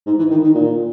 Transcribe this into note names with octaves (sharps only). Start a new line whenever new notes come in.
G#2
E3
D#3
D#3
A#2